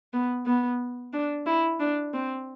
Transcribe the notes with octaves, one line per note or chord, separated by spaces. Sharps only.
B3
B3
D4
E4
D4
C4